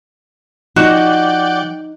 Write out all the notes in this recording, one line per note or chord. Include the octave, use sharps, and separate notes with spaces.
F3 D#4 F#4 D5 F#5 G5